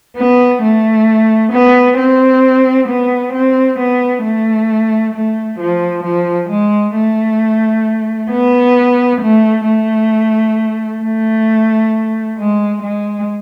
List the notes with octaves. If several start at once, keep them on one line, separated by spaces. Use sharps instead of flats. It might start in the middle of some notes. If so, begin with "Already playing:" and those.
B3
A3
B3
C4
B3
C4
B3
A3
A3
F3
F3
G#3
A3
B3
A3
A3
A3
G#3
G#3